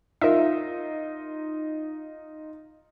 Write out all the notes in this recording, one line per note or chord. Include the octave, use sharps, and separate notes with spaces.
D#4 F4 A#4 E5